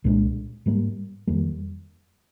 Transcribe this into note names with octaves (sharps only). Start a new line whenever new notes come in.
C2 A#2 G#3 D4
G#2 G3 A#3
F2 D#3 G3 A#3